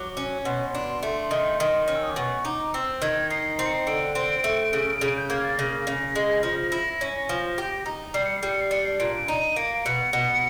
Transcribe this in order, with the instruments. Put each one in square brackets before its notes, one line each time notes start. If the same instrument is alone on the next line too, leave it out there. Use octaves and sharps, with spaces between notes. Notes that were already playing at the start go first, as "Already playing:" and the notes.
Already playing: [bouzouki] F#3 [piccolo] D6
[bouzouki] C#4
[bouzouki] B2 [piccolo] C6
[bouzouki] D4
A3
D#3
D#3
[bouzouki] C#4 [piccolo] F6
[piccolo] E6
D#6
D6
[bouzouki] B2 [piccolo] C#6
[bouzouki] D#4 [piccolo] D6
[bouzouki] C4 [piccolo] E6
[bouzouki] D#3 [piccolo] G#6
[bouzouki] D#4 [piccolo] C7
[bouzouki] C4 [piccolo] C7
[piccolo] C#7
C7
[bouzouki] D3 [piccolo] D7
[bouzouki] C4
A3
C#3
C#3
[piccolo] G6
[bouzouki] A#3 [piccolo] G#6
[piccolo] A6
[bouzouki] C#3 [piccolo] A#6
[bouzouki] C#3
G#3
F3
E4
C#4
F3
G4
D#4
[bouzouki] G3 [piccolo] C7
[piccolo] C#7
C7
[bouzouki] G3
[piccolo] C#7
C7
[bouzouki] D4 [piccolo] C#7
[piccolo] C7
[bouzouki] A#2 [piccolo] D7
[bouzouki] D#4 [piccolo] D#7
[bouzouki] A#3 [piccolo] D7
[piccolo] D7
[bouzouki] B2 [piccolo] C#7
[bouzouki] B2